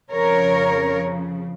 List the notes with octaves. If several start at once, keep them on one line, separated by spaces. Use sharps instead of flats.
F2 C#3 F3 A#4 C#5